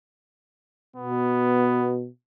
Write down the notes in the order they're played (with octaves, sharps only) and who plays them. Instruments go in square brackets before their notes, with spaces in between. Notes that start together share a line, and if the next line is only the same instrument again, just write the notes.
[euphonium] B2 [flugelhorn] B3